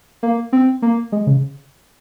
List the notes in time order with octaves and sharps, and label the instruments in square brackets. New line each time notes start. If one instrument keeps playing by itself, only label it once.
[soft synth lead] A#3
C4
A#3
G#3
C#3